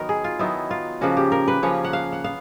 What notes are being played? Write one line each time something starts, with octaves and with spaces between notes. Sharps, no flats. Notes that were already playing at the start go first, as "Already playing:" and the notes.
Already playing: D#3 F#3 B3 D#4 A#4
G#4
F4
D#3 F#3 B3 D#4 E4
F4
C#3 F3 A#3 C#4 F#4
G4
A#4
B4
C#3 F3 A#3 C#4 C#5
F#5
F5
F#5
B3 F5